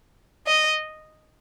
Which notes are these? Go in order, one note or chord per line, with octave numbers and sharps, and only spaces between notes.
D#5